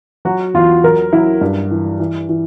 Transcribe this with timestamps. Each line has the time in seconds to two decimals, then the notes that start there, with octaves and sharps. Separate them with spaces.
0.25 F#3 F#4
0.54 E2 F4
0.84 F#3 A#4
1.13 F#3 E4
1.41 G2
1.71 E3
2.00 E3
2.29 E3